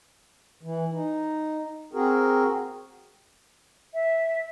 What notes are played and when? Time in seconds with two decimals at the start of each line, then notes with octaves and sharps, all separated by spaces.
0.63 E3
0.93 D#4
1.93 C4 F#4 G#4 A#4
3.94 E5